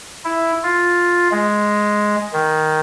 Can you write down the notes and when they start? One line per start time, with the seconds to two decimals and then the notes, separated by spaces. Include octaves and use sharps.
0.25 E4
0.63 F4
1.32 G#3
2.33 D#3